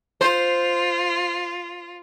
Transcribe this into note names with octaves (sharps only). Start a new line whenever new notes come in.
F4 C5